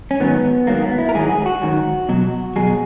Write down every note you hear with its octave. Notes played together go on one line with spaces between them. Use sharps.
C#4
G#2 D#3 F#3 B3
G#2 D#3 F#3 A#3
B3
E4
A#4
G#2 D#3 F#3 G#4
G#4
G#4
F#4
G#2 D#3 F#3
B2 F#3
B2 F#3 G#4